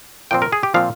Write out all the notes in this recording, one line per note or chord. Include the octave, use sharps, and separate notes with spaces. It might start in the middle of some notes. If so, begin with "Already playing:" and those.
A#2 F3 C4 G5
A#4
G#4
G4
A#2 F3 C4 F5